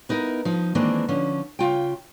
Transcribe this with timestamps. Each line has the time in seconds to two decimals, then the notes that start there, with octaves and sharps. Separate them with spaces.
0.09 B3 D#4 E4 A#4
0.45 F3 D#4
0.75 D#3 E3 G#3 A#3 C4 D4
1.08 D3 F3 C#4
1.59 C#3 F4 G5